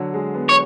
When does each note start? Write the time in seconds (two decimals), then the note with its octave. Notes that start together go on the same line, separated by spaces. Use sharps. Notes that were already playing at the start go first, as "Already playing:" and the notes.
Already playing: D3 F#3
0.14 G#3
0.34 B3
0.49 C#5